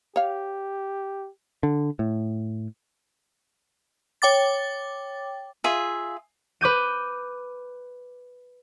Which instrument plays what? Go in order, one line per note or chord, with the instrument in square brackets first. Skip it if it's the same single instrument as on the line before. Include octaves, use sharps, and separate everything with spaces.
[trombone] G4 [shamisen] C#5 F5
[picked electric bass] D3
A2
[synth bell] C#5 G5 D6 A6
[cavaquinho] F4 G#4 E5
[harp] B4 D6 G6 D#7